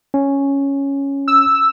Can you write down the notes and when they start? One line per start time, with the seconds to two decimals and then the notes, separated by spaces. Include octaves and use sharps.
0.14 C#4
1.28 E6